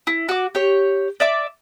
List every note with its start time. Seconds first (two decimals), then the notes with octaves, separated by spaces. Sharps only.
0.07 E4
0.29 F#4 D6
0.55 G4 C#5
1.20 D5 E5 D6